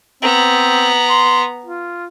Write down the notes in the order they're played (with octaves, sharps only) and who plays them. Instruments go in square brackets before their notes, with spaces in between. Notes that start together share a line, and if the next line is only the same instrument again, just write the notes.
[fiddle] B3 A#5 [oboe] C4
[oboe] C6
F4